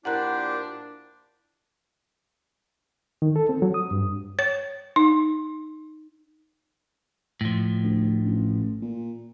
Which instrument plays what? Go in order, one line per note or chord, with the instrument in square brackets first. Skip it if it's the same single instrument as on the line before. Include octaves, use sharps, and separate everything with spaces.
[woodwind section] A#2 E4 [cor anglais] D4 [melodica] G4 C5 [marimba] F#5 A#5 F#6
[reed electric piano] D#3
A4
C4
F#3
D#6
G2
[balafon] C#5
D#4
[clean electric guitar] A2 F3
[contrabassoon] D2
A1
A#2